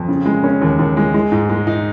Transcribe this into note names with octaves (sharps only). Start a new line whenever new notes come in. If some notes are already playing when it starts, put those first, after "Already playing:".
Already playing: F2
C#3
G#3
C#4
D#2
D#2
G#3
G#3
G#2
G#3
D#4